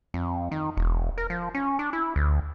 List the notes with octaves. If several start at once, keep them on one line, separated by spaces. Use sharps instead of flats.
F2
D#3
E1
A#4
F3
C#4
D4
E4
D2